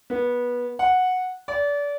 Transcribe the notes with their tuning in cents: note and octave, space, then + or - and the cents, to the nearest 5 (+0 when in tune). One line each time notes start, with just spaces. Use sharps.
B3 -20
F#5 -10
D5 -30